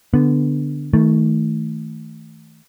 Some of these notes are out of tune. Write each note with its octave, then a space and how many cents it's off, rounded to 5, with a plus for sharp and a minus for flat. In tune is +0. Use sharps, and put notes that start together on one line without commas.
D3 +0 B3 +0
D#3 +35 A3 +0